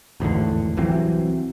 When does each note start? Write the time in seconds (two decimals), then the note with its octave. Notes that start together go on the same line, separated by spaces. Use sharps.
0.20 G#1 E2 A2 D3
0.77 C2 E3 F#3 C4